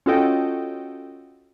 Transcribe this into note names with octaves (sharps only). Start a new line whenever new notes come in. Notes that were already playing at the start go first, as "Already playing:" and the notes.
C#4 F4 F#4 A4 D#5 G5